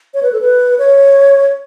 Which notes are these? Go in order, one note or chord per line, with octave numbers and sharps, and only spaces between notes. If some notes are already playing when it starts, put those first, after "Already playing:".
C#5
B4
A4
B4
C#5